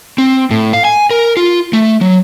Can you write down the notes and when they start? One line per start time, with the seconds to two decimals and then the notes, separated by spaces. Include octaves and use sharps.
0.18 C4
0.51 A2
0.73 F5
0.85 G#5
1.10 A#4
1.37 F4
1.73 A3
2.01 F#3